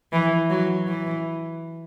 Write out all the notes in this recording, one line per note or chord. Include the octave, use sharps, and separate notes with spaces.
E3
F#3
E3